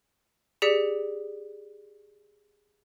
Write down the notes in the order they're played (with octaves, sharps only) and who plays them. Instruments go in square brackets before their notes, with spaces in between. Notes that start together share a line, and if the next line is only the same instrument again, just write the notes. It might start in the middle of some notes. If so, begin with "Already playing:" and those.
[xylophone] G4 G#4 D5 B6 C#7